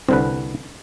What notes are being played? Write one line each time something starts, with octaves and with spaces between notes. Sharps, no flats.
C2 D3 C4 B4